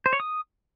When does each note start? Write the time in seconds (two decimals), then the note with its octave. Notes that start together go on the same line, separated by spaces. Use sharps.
0.06 C5
0.13 C#5
0.20 D#6